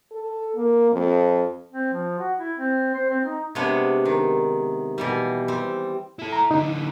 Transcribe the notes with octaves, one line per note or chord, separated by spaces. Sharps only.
A4
A#3
F2
C4
F3
F#4
E4
C4
C5
C4
D#4
C3 G#3 B3 D4 C#5
D#3
B2 E3 G3
G3 C4
E4 A4
A#5
D3 E3 D#4